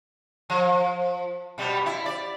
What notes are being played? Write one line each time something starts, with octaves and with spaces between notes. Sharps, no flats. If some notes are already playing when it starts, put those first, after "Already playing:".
F3
B2 G3 B3
E4
D5